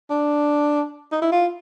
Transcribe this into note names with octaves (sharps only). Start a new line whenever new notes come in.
D4
D#4
E4
F4